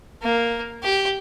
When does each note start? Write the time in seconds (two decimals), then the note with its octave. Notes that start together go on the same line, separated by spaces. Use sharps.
0.22 A#3
0.83 G4